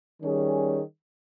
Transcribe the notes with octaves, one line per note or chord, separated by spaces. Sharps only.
D#3 G3 C#4 G#4